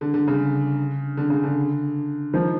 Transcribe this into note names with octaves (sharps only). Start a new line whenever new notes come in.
D3
D3
C#3
D3
C#3
D3
D#3 F3